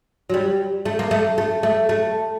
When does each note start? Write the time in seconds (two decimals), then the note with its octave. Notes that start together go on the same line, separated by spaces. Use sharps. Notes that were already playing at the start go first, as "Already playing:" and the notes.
0.30 F#3
0.34 G3
0.86 A3
0.99 A#3
1.11 A3
1.38 A3
1.63 A3
1.89 A3